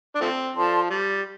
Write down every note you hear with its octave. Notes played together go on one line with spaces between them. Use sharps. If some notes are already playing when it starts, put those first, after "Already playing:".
D4
F3 A3 C4
F3 A4 D5 A5 C6
G3